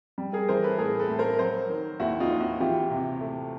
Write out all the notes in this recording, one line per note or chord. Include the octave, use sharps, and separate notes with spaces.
G3
G#4 A#4
E3 A#4 C5
A4 B4
A2 G#4 A#4
A4 B4
A2
A#4 C5
F#3 A#4 C5
D#3
D#2 E4 F#4
D#4 F4
D#2
E4 F#4
E3 F4 G4
C3
A3